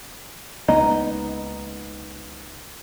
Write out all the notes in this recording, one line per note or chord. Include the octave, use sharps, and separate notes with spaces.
C#2 A#3 B3 D#4 D#5